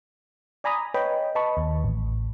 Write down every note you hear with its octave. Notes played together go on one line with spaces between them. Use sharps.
D5 G#5 A#5 B5 D#6
B4 C#5 D#5 G5 B5
B4 D#5 A5 B5 C#6
D#2
A1